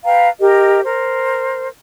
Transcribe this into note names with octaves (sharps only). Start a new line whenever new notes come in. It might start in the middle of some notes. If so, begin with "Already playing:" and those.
B4 F5 G5 A#5
G4 A#4 D#5
A#4 C5